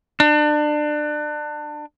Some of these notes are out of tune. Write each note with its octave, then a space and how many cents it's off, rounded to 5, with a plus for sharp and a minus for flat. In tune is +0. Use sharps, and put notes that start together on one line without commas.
D4 +30